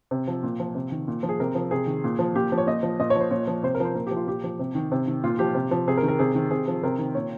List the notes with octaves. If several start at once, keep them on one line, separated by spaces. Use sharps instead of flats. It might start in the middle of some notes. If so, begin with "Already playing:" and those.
C3
F3
A#2
F3
C3
D#3
A#2
F3
G#4
C3 A#4
F3
C3 G#4
D#3
A#2
F3
A#2 G4
F3
C#5
A#2 D#5
F3
A#2 D#5
C#5
F3
C5
A#2 C#5
F3
C3 C5
A#4
F3
C5
A#2 A#4
G4
F3
F4
A#2 G4
F3
C3
D#3
C3
D#3
A#2 F4
F3 G4
C3
F3
C3 G#4
A#4
D#3
A#4
C3 G#4
D#3
C3 G#4
F3
C3 A#4
D#3
A#2 C#5